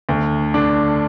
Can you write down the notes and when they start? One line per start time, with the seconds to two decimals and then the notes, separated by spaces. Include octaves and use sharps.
0.09 D2
0.54 D3 D4